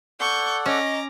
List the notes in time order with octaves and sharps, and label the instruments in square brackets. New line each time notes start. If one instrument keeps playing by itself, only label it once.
[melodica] A4 D5 F#5 [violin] C#6 G6
[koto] C#4 [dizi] D#5 [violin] A#5 D6